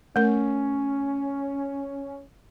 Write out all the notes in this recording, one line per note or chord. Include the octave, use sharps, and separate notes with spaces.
A3 C#4 A#4